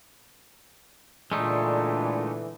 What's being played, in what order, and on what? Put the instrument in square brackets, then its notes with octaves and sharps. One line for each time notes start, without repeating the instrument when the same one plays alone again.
[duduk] A#2 [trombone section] D3 E3 [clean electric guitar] G#3 A3 D#4 [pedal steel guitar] D4